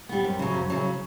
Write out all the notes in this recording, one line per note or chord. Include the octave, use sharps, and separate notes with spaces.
G3 B3
F#2
C#3 F#3
F#2
C#3 F#3